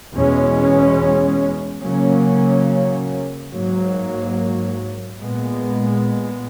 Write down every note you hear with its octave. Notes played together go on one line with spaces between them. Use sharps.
E2 B2 G#3 C#4
C#3 F#3 A#3 C#4
G#2 F#3 A#3
A#2 G#3 B3